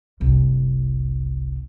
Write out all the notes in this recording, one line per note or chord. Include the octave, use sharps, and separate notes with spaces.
F#1 C2